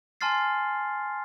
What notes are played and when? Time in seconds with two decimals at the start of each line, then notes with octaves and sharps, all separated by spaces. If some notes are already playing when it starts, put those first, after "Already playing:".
0.21 G#5 A5 C6 F6 A6 C7